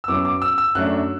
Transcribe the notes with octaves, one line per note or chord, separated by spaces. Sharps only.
E6
F#2 F#3 B3 D6
D6
E6
E6
F#2 F#3 A3 D4 F#6